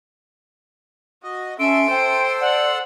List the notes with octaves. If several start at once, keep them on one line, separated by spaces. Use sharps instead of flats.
F#4 D#5
C#4 A4 E5 C6 E6 D7
C5 G5
D5 F#5